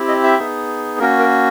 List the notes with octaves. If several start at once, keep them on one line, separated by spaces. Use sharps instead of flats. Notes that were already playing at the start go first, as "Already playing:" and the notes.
Already playing: C4 E4 G4
D#5
E5
B3 D#4 G#4
A#3 C#4 F#4 A#4
A#4